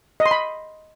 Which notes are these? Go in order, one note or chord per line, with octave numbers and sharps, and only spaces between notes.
D#5
C6
B5